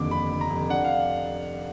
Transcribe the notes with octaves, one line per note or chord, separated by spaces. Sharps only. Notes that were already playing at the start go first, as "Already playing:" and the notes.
Already playing: F1 D#2 D3 D6
F1 B5
D3
A#5
F1
D4 F#5
F5